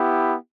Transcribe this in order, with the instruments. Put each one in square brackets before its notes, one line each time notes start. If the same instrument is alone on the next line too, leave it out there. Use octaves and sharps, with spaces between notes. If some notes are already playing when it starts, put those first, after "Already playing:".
Already playing: [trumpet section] B3 E4 G4